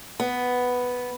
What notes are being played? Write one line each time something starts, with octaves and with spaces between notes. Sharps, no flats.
B3